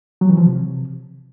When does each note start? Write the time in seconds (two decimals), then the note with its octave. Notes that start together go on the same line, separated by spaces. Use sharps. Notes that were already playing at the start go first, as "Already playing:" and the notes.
0.21 F#3
0.29 E3
0.37 F3
0.45 C3